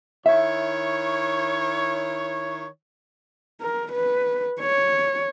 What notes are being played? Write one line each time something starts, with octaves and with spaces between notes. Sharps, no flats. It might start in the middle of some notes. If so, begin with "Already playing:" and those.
D#3 E4 C#5 E5
A#4
B4
C#5